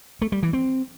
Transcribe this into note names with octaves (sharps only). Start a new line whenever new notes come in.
A3
G3
E3
C4